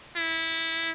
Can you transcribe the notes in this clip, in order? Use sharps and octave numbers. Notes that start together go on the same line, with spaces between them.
E4